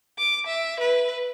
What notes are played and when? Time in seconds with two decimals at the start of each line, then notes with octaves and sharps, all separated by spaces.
0.18 D6
0.47 E5
0.80 B4